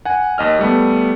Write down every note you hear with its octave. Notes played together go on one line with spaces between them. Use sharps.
F#5 G#5
D#2 D#5 F6
G3 A3 B3